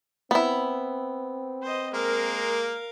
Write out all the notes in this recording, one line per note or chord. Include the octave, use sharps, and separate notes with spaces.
B3 C4 E4
C5 D#5
G#3 A#3 A#4 F5